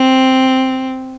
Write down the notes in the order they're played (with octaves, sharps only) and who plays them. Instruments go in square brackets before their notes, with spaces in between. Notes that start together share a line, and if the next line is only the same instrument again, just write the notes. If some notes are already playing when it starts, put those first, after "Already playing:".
Already playing: [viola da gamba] C4